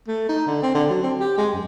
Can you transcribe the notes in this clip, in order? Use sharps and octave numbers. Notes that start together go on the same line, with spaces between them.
A3
D#4
D3
C4
D3
F#3
C4
G4
G#3
F#2